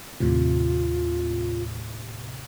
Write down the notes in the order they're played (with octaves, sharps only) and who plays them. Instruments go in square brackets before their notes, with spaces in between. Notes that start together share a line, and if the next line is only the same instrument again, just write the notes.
[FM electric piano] D#2 A2 C3 [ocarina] F4